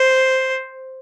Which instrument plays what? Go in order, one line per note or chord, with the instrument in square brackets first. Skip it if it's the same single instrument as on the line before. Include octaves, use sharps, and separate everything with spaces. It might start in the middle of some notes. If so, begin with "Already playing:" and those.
Already playing: [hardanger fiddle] C5